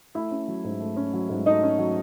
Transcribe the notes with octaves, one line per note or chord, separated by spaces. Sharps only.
A3 E4 E5
C#4
F#3
G#2
A3
C#4
F#3
G#2
A3 D#4 D#5
C#4
F#3